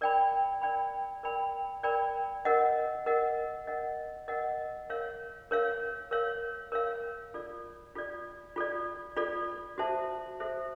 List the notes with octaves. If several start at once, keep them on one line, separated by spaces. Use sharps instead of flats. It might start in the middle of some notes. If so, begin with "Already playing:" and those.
A#4 D5 G5 B5
A#4 D5 G5 B5
A#4 D5 G5 B5
A#4 D5 G5 B5
A#4 D#5 F#5
A#4 D#5 F#5
A#4 D#5 F#5
A#4 D#5 F#5
A#4 C#5 F5
A#4 C#5 F5
A#4 C#5 F5
A#4 C#5 F5
F4 A4 D5
F4 A4 D5
F4 A4 D5
F4 A4 D5
F#4 A4 C5 E5 A5
F#4 A4 C5 E5 A5